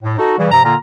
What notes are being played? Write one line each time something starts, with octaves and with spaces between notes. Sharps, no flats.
A2
D#4 F#4 A4
C#3 E3 G3
G2 C3 F3 A#5
A#2 D3 A#3 F4 A#5